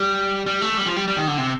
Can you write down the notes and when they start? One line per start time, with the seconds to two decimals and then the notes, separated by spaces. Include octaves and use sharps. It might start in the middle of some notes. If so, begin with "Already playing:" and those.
Already playing: G3
0.46 G3
0.62 A3
0.77 G3
0.86 F3
0.96 G3
1.08 G3
1.17 D#3
1.28 D3
1.38 C3